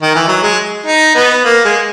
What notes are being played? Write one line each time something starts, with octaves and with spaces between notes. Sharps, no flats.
D#3
E3
F#3
G#3
D#4
B3
A#3
G#3